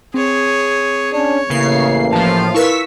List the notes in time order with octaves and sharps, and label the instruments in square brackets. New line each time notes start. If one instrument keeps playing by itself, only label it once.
[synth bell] C4 [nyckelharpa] G#4 C#5
[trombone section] C#4 D4 [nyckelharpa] C#5
[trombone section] A1 E3 A#3 [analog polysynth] C#3 C7
[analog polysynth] A2 F3 [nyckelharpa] F4 F5 [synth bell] A5
[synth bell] E4 A#4 B4 [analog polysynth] C#6 E6 B6